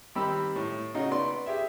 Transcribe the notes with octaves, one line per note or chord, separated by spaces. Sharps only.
D#3 G3 C4 G4 B5 E6
A2
C#3 D#4 F#4
B3 D5 C6
G4 G#4 E5